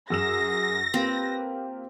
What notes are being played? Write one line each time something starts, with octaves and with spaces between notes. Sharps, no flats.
F#2 G#4 E6 A#6 E7
A#3 C4 F4 G4 B4